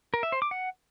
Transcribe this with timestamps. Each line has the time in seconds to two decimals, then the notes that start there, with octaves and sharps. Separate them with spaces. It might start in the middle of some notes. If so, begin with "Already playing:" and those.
0.14 A#4
0.23 E5
0.32 C5
0.42 D6
0.51 F#5